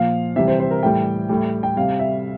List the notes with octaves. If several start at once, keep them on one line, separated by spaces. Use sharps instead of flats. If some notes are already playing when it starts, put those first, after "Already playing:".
Already playing: A#2 F3 F5
C3 E3 G3 E5
C5
C5
A#4
A2 E3 G3 G5
A2 G3
G5
C3 G3 F5
E5